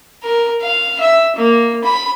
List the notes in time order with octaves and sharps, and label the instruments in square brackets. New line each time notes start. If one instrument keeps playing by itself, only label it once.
[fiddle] A#4
F5
E5
A#3
B5